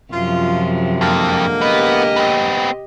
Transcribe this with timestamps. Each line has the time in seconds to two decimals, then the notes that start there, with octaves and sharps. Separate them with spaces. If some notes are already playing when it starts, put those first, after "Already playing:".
0.13 F#2 C3 F3 F4
1.01 F2 D3 G#3 A#3
1.61 B3 G4 D#5
2.16 B3 C4